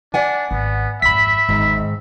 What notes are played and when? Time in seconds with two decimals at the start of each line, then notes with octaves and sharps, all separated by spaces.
0.14 D4 D5 F#5 G#5
0.51 G#1 B3
1.02 G#1 F2 E5 B5 B6
1.49 G#1 E2 G#2 D#3